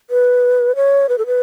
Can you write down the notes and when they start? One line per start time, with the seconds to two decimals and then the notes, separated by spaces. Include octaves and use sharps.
0.10 B4
0.76 C#5
1.09 B4
1.18 A4
1.26 B4